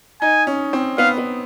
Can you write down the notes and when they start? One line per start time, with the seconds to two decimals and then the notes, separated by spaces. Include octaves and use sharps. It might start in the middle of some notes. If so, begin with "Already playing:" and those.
0.21 D#4 G#5
0.47 C#4
0.73 C4
0.98 B3 F5
1.18 B3